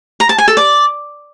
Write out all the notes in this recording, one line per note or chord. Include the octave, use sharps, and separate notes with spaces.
A#5
A5
G#5
A4
D5